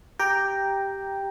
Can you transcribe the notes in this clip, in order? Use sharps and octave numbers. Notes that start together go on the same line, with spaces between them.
G4 G5 A#5